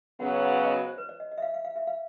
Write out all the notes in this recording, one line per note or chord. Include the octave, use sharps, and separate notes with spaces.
C#3 F#3 B3 F#5
F5
D#5
C#5
C5
B4
D5
D#5
D#5
E5
F5
F5
F5
E5
F5